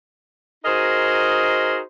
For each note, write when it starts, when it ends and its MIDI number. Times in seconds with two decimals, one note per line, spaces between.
0.64 1.78 63
0.64 1.78 66
0.64 1.78 68
0.64 1.78 70
0.64 1.78 72
0.64 1.78 75